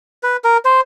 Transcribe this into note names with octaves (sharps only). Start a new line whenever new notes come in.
B4
A#4
C5